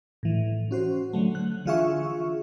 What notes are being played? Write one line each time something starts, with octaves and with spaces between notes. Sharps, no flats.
A2 E3
C#4 F#4 C5
D3 F#3 A3
F#6
D3 E3 F4 G#4 E5 C#6